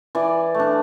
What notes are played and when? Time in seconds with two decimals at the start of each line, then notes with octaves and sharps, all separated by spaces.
0.15 E3 D5
0.55 A3 D4